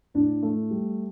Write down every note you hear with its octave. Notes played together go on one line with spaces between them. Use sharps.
A2 D4
A3
G3